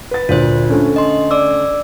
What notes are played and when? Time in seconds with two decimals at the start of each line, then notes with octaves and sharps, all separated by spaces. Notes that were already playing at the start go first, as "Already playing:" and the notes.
0.11 B4 A6
0.29 D2 A#2 F4 C5
0.70 D3 A3 C#4
0.96 D#5 C6
1.31 D5 D6 E6